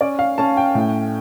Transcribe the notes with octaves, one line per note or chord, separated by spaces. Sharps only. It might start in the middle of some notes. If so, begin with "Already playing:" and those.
C#4 D5
F5
C#4 A5
G5
A2